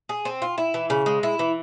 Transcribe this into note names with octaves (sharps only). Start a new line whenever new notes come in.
G#4
C4
F4
E4
E3
C#3
G#3
E4
E3